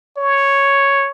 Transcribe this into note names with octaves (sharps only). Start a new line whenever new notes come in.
C#5